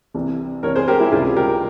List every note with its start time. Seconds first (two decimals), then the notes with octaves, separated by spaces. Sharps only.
0.14 C2 C3 E3
0.63 C2 C3 E3 A#4 C#5
0.76 G#4 C5
0.88 G4 A#4
1.00 E4 G4
1.12 C#2 C3 G3 F4 G#4
1.36 G4 A#4